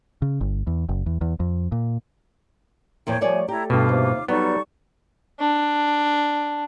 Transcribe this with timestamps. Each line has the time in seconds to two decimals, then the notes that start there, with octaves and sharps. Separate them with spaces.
0.22 C#3
0.41 G1
0.67 E2
0.89 F#1
1.06 E2
1.21 E2
1.40 F2
1.72 A#2
3.07 E2 A#2 F3 C#5 G5
3.21 A#2 F3 G3 A3 C#5 D5 G#5
3.48 A3 E4 G4 A4 G5 A#5
3.70 G2 B2 F4 D6
3.89 D#2 C3 A#3
4.28 F#3 G3 B3 D#4 A4 C#6
5.40 D4